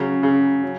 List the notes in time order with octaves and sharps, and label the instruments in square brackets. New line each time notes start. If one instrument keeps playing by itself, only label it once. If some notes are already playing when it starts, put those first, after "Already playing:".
Already playing: [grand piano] C#3 [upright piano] F#3 C#4 G#4
[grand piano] C#3
[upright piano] F#3 C#4